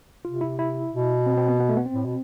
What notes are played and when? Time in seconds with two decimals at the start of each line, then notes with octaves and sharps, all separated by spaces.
0.25 C3 F4
0.41 E4
0.59 E4
0.92 B2
1.26 C4
1.37 C4
1.48 B3
1.60 B3
1.69 A3
1.77 B3
1.86 C4
1.94 A2
2.05 B2